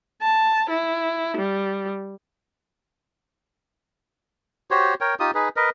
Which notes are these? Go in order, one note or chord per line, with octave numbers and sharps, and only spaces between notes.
A5
E4
G3
F#4 G4 C5 C#5
A#4 C#5 G5
D#4 F4 G4 D#6
D#4 G#4 B4
A#4 B4 D#5